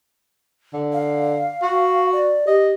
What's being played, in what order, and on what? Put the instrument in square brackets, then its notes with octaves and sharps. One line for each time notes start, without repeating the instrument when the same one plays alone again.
[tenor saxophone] D3
[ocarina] F5
[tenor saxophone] F#4
[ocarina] D5
[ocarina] G4 [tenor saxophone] D#5